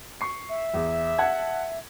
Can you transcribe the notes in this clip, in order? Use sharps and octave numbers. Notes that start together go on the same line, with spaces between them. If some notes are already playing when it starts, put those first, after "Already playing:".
C#6 C7
E5
E2
F#5 A5 G#6